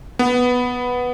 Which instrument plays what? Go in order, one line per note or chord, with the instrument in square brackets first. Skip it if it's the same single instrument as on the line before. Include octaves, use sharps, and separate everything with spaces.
[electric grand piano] B3